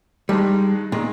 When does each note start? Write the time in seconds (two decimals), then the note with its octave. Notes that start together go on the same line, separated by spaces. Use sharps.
0.29 G2 D#3 G3 G#3
0.92 A#2 D#3 G#3